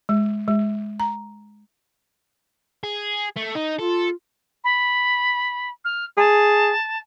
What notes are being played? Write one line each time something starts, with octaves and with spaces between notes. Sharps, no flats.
G#3
G#3
A#5
G#4
A3
D#4
F4 A4
B5
F6
G#4 A5